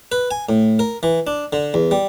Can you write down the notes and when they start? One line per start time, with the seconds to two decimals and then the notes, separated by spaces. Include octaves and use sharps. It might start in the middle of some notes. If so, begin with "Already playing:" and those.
0.12 B4
0.31 G#5
0.49 A2
0.79 A#4
1.03 E3
1.27 D4
1.53 D3
1.74 E2
1.91 G3